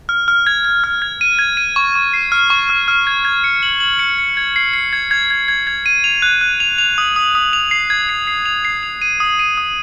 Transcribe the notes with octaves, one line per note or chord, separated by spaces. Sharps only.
F6
F6
G#6
G#6
F6
G#6
D#7
G#6
D#7
C#6
C#6
C7
F6
C#6
F6
F6
G#6
G#6
C#7
F#7
F#7
C#7
C#7
G#6
C7
C7
G#6
G#6
G#6
G#6
G#6
D#7
F7
F#6
F#6
F7
F7
D#6
D#6
D#6
F7
C7
G#6
C7
C7
F7
C7
F7
D#7
D#6
D#7
D#6